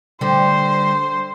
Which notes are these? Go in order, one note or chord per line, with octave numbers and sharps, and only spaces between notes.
D3 G3 C5